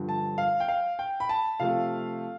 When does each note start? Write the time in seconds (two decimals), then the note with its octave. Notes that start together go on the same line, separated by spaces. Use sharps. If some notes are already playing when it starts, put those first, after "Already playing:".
Already playing: G2 D3 F3
0.09 A5
0.38 F5
0.60 G5
0.68 F5
0.99 G5
1.20 B5
1.29 A5
1.60 C3 F3 A3 F5